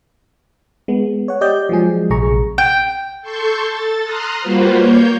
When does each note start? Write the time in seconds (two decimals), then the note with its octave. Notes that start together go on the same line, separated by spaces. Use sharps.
0.88 G#3 B3
1.28 C#5 F#5
1.41 G4 D5 D#5 G6
1.69 F3 F#3 G#3 G#4
2.10 A#1 C3 G#4 A#5 C#6
2.58 G5
3.22 A4 C6 C#6 G6
3.62 A4 A6
4.04 A#5 C6 D#6 F6 F#6
4.40 G3 A#3 F4 F#4 B4 C5
4.74 A#3 C#5 G6